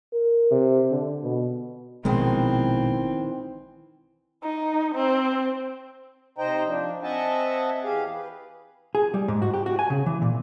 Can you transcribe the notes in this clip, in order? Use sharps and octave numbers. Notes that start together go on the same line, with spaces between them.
A#4
C3
D3
B2
A#1 B2 D#3 E3 G#3 C4
D#4
C4
C3 D#4 C5 D#5 G5 A#5
F3 D4
C4 D#5 E5 F#5 G#5 A5
E2 G4 G#4 F5
B4
G#4
G3
G#2
F#4
G4
F#4
G#5
C#3
E3
A#2